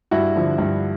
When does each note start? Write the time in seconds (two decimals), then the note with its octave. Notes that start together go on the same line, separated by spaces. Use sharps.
0.11 G2 E4 F#4
0.36 D3 F3
0.58 G2